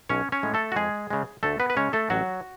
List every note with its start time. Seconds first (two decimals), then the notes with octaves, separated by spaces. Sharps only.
0.09 B1 C#4 C#5
0.32 C#4 C#5
0.43 A2 G#3
0.54 A3 A4
0.72 F#4
0.76 F2 G#3 G#4
1.10 C#3 G#3
1.43 D2 A3 A4
1.60 B3 B4
1.70 B4
1.77 C#3 G#3 C#4 C#5
1.93 A3 A4
2.10 A1 F#3 F#4